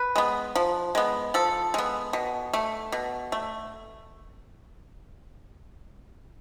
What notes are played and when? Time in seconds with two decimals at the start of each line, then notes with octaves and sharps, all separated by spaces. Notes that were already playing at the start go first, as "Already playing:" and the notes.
Already playing: B4
0.16 G#3 B3
0.55 F3
0.95 G#3 B3
1.34 F3 A4
1.74 G#3 B3
2.13 B2
2.53 A3
2.92 B2
3.32 A3